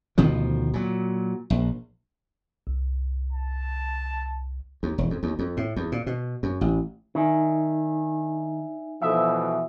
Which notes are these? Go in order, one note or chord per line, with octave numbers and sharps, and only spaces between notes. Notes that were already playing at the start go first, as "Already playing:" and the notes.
D2 B2 D#3 F3
A#2 F#3
A#1
C2
A5
D#2
E1
F2
D#2
F2
A2
E2
A#2
B2
F#2
A1
D#3 D4 D#4 E5 G#5
B2 E3 F3 A4 E5 D#6 E6